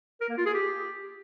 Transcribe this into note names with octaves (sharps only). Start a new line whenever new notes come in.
A#4
A#3
F4
G#4
G4